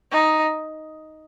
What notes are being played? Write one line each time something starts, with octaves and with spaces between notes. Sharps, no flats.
D#4